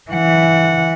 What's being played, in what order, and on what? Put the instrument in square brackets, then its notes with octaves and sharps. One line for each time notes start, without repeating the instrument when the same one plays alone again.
[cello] E3 F#5